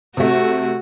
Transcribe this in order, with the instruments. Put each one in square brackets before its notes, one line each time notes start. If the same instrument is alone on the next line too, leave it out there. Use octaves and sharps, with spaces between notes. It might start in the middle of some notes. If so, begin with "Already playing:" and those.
[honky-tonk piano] C3 A3 [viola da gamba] F#4